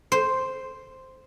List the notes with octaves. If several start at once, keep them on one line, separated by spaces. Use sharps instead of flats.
C5